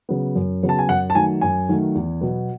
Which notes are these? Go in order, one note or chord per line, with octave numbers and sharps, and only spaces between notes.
C#3 F#3 B3
F#2
C#3 F#3 B3
A5
G#5
F#2 F#5
A5
D#3 F#3 A3 G#5
F#2 G#5
D#3 F#3 A3
E2
B2 F#3 B3